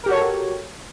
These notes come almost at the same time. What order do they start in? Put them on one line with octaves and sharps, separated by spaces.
A#4 G4 F#4 C#5 A4